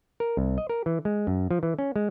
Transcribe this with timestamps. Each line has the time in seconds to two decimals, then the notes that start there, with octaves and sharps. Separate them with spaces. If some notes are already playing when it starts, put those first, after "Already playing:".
0.20 A#4
0.37 C2
0.58 D#5
0.69 A#4
0.86 E3
1.05 G#3
1.27 F#2
1.51 F3
1.63 E3
1.79 C#4
1.96 G#3